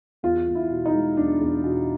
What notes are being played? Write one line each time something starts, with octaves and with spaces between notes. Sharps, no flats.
E2 F4
E2
E4
B2
D#4
G#3
E2 D4
E2
B2